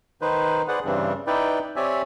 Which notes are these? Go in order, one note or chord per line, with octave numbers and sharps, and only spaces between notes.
D#3 D#4 B4 C5
G#4 B4 C5 D5 F#5
G2 C#3 E3 G3 C4 D4
D#4 E4 B4 D5 G5
C4 G4 C#5 D5 E5 G#5